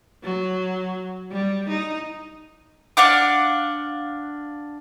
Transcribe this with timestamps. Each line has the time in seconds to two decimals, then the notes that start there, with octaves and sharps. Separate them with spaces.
0.23 F#3
1.31 G3
1.69 D#4
2.97 D4 F5 F#5 D6